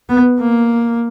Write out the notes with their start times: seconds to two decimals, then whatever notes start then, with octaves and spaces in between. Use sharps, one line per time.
0.09 B3
0.41 A#3